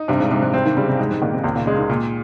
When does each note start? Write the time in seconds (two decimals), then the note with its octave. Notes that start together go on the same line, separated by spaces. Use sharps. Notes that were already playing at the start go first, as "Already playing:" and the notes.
Already playing: D#4
0.08 G2 C3
0.20 G#2
0.31 G#2 C3
0.42 G#2
0.54 G#2 C4
0.65 D#3
0.76 C#3 G3
0.88 C3
0.99 G#2 G#3
1.11 G#2
1.21 A#2 D#3
1.33 C3
1.44 C#2 A#2
1.56 A#2
1.67 C#3 G#3
1.78 D#3
1.90 A#2